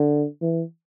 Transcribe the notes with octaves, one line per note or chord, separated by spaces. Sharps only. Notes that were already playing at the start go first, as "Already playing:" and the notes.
Already playing: D3
E3